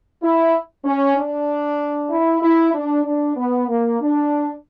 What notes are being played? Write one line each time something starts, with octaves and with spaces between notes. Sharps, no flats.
E4
C#4
D4
E4
E4
D4
D4
B3
A#3
D4